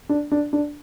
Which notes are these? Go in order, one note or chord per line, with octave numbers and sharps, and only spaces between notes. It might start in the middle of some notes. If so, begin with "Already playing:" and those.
D4
D4
D4